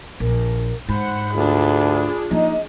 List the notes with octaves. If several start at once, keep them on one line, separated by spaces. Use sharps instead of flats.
A#1 A#4
G#2 C5 F#5 B5
D2 D4 F4 G#4
F3 A#3 D#4 D#5